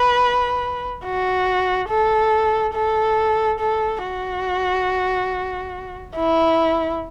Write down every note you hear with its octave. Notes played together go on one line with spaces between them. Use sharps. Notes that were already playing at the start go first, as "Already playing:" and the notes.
Already playing: B4
F#4
A4
A4
A4
F#4
E4